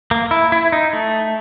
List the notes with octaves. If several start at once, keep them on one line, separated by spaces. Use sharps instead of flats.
A#3
E4
E4
D#4
A3